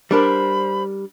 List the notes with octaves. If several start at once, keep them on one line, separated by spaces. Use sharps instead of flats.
G3 D4 A#4 C5 B5